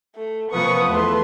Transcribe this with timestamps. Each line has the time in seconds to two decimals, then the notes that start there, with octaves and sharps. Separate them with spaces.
0.16 A3
0.52 C3 F3 A#3 B3 B4 C#6 D#6
0.90 E2 A3 E5 C6